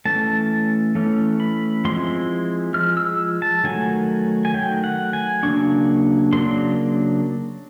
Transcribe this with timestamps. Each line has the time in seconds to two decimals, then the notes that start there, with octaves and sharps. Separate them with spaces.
0.05 E3 A3 C#4 A5
0.95 E3 A3 C#4
1.40 B5
1.85 F3 G#3 C4 E4 C6
2.74 F3 G#3 F6
2.97 E6
3.42 A5
3.64 D#3 F#3 A3 G#5
4.45 G#5
4.54 D#3 F#3 A3 G5
4.84 F#5
5.13 G#5
5.43 C#3 F#3 A#3 D4 C#6
6.33 C#3 F#3 A#3 D4 C6